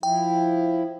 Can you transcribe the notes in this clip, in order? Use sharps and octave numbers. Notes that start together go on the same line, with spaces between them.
F3 E4 G5